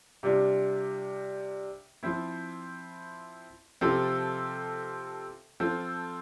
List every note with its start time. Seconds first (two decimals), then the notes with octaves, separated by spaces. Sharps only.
0.23 C3 G3 D4 F4
2.03 F3 C4 E4
3.81 C3 F3 C4 F4 A4
5.60 F3 C4 F4 A4